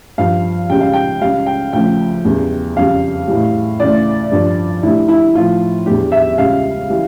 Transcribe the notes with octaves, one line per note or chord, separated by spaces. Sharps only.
G2 F3 F5
C#2 C#3 G3 G5
F5
G5
C#2 C#3 G3 F5
G5
D2 C#3 F3 G5
E2 C#3 G3
F2 C#3 G3 F5
A2 E3 G3
D2 C#3 E3 D5
G2 D3 F3
D2 D3 G3 E4
E4
A2 F3 F4
E2 D3 G3 G4
E5
C#2 C#3 G3 F5
E3 G3